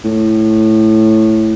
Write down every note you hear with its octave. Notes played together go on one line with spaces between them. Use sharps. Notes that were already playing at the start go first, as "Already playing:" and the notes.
A2